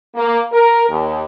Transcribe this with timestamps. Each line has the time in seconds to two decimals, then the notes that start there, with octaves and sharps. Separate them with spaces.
0.15 A#3
0.52 A#4
0.90 D#2